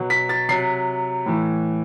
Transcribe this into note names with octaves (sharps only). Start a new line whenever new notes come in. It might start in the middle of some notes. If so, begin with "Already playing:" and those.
Already playing: B2 F#3
B6
A6
C3 F#3 C7
A2 E3